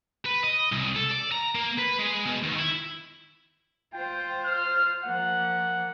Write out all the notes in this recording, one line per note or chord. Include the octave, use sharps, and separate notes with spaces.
B4
D#5
C2
A4
D5
A#5
A#3
B4
G#3
B2
D#2
E4
F4 C5 G5
F6
F3 A#3 F#5